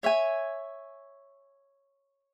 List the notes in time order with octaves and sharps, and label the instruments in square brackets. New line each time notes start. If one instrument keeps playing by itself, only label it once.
[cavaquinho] C#5 E5 G#5